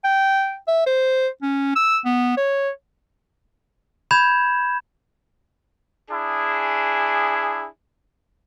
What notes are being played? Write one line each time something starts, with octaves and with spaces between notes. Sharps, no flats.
G5
E5
C5
C#4
E6
B3
C#5
B5 G6 G#6 E7
D4 E4 G#4